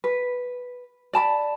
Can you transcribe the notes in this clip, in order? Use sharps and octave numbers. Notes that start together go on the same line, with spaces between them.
B4
D5 A5 B5